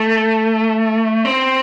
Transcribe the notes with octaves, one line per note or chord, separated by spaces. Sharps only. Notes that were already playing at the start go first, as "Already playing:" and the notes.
Already playing: A3
C4